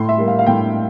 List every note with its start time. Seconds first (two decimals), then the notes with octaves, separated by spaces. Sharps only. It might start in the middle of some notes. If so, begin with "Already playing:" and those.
Already playing: A2 C6
0.09 E5
0.18 G3 A#3
0.27 F5
0.39 F5
0.46 A2 G5